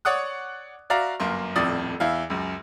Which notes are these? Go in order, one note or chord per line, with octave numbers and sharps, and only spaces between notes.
C#5 D5 F#5 D#6 F#6
F#4 D5 E5 F5 A#5
G1 F#2 A#3 C6
D#1 F2 A2 D5 D#6
E2 E4 F5
C#2 F#2